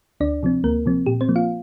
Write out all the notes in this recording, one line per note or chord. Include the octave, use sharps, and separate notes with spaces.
D2 D4 D5
C3 F3 C4
D2 A#3 A#4
C3 F3 C4
A#2 G4
C4 C5
F3 A#3
F4 F5